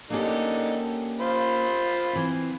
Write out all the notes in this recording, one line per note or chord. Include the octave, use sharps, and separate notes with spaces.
D3 A#3 C#4 D#4 G4 A4
F4 C5 B5
E3 C4